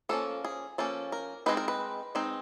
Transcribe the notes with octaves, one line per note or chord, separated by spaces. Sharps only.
F3 A#3 C#4 A4
G#4
F3 A#3 C#4 A4
A#4
G#3 C4 D#4 B4
A#4
B4
G#3 C4 D#4